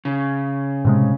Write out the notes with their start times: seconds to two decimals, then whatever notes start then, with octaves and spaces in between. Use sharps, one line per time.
0.05 C#3
0.85 A2 C3 G#3